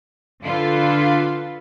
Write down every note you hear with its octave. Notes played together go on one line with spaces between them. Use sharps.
D3 D4 F4 A4 B4